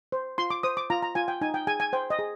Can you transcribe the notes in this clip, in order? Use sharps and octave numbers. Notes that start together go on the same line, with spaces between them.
C5
F4 C6
D6
C5 D#6
D6
F4 A#5
A#5
F4 G#5
G5
D#4 G#5
G5
G#4 G#5
G#5
C5 G5
D#5
G#4